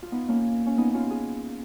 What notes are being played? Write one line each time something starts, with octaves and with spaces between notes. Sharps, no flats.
F4
B3 D#4
A#3 C#4
C#4
B3 D#4
C#4 F4
F4 G#4